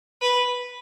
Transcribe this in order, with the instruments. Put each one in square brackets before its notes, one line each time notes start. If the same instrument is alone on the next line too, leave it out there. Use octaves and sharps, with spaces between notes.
[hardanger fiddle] B4